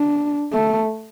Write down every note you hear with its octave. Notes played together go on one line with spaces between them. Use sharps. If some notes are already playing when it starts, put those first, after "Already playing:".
Already playing: D4
A3